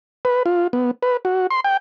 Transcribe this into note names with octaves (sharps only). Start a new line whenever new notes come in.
B4
F4
B3
B4
F#4
C6
G5